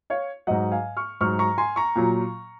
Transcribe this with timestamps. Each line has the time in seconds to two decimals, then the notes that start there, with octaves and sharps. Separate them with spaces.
0.10 C#5 F5
0.47 G#2 F#3 D#5 F#5
0.72 F5 G#5
0.97 C#6 F6
1.21 G#2 F#3 C#6 F6
1.39 A#5 C#6
1.58 G#5 C6
1.76 A#5 C#6
1.96 A#2 F#3